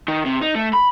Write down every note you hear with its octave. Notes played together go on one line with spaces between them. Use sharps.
D#3
C3
D#4
A3
B5